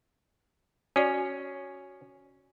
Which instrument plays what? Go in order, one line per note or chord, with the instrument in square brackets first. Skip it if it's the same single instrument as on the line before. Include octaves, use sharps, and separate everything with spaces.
[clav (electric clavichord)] C#4 [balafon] F#4 D5